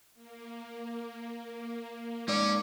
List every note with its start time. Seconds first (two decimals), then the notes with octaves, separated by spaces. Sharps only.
0.14 A#3
2.28 G#2 C#4 D5